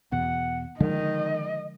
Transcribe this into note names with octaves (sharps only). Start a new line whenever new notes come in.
E2 B2 F#5
D3 D#3 F3 G#3 D#5